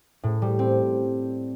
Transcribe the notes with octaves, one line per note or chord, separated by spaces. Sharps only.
A2
G3
C4